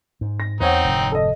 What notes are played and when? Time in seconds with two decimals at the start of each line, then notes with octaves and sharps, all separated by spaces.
0.21 G#2
0.40 A#6
0.60 E2 E3 C4 D#4 C5 C#5 F#5
0.85 F1 G#2 D3
1.12 A4 D#5